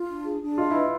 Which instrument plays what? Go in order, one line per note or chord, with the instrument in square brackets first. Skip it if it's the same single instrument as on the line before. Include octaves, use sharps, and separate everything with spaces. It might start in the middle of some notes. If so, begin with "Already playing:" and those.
Already playing: [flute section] F4
D4
G#4
D4
[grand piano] F4 [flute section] D#5
[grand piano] E4 [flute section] B4